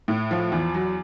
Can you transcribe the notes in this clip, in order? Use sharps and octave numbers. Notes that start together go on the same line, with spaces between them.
A2
F3
E2
F#3